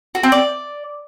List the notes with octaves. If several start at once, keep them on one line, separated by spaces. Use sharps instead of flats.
F#4
C4
D5